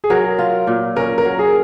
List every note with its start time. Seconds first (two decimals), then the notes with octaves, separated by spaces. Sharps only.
0.04 G#4
0.10 F#3 A#4
0.39 F4
0.67 A#2
0.96 C#4 A#4
1.18 A#4
1.25 F#3
1.39 G#4